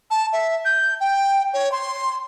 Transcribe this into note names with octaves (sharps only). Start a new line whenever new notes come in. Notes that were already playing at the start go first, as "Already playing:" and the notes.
A5
E5
G6
G5
C#5
C6